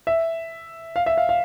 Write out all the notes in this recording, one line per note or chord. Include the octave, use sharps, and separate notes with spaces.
E5
F5
E5
F5
F5